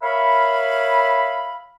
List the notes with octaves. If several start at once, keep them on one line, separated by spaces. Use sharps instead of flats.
A#4 C#5 E5 F5 B5